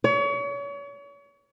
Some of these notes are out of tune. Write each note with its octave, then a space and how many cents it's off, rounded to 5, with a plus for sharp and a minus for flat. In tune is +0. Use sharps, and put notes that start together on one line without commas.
C#5 +35